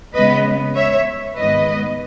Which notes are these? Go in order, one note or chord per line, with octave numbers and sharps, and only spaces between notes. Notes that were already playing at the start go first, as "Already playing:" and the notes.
C#3 G#3 B3 B4 D#5
C#5 E5
G#2 D#3 G#3 B3 B4 D#5